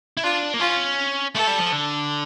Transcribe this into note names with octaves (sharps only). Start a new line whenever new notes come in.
E4
D4 F4
A#3
C#4 F4
A3 A4
G3
F3
D3